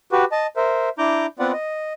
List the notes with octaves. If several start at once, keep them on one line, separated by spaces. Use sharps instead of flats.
F#4 G4 B4
D#5 A5
A#4 C5 E5
D4 E4 A#5 D6 G6
B3 C4 F4 B4 D5 F#5
D#5